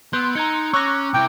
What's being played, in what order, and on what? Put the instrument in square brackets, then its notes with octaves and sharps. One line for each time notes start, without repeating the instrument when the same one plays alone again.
[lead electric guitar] B3 [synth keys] C6 E6 [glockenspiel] F#6 G6 D7
[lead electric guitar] D#4 [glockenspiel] A#5 G#6 C#7
[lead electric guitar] C#4 [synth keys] C#6 F#6 A#6 [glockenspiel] D6 E6
[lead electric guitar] C3 E4 [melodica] G5 [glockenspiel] D6 D7